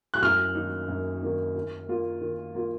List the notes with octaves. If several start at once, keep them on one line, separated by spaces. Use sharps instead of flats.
F#6
F#2 F6
D#3 A#3 D#4
F#2
D#3 A#3 D#4
D#3
A#3 F4
D#3
A#3 F4